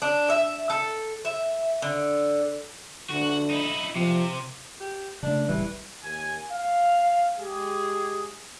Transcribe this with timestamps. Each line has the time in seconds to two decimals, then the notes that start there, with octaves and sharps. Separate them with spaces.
0.02 D4
0.30 E5
0.70 A4
1.25 E5
1.82 D3
3.10 D3 F#4
3.50 D#4 E4
3.95 C3 F3
4.80 G4
5.23 C#3 A3 D4
5.48 D#1 A1 E3 G3
6.03 D#2 G#5
6.51 F5
7.39 G#3 G4 G#4